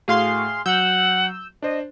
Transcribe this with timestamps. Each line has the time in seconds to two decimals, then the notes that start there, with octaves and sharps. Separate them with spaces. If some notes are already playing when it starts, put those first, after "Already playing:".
0.08 A2 A3 F#4 G#4 F5 C6
0.66 F#3 F#5 E6 G6
1.62 D4 C5 D#5